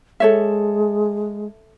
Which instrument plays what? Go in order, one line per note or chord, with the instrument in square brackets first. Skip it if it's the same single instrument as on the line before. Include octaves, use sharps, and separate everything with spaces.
[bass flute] G#3 [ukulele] A4 C#5 E5